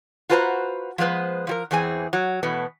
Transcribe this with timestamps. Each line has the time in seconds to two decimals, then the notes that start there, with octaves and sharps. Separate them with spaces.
0.29 F4 F#4 B4 C5 A5 A#5
0.98 F3 G#3 B3 B4 C5
1.47 F3 F#3 A#4
1.71 E2 E3 C4 G#4 G#5
2.13 F#3
2.43 B2 E3 A3 B3